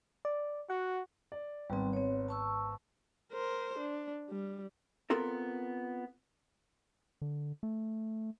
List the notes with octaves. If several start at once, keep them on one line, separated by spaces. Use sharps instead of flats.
D5
F#4 F#5
D5
G#1 G3 B3 C4
C4 C#5
A5 C#6 E6
A#4 C5
D4
G3
B3 C4 F4 A4 A#4
D3
A3